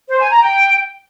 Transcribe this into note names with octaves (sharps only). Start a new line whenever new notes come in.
C5
G#5
A#5
G5